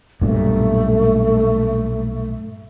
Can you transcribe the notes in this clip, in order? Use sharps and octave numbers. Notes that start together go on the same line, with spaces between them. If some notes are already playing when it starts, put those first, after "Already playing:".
B1 G2 A#2 A3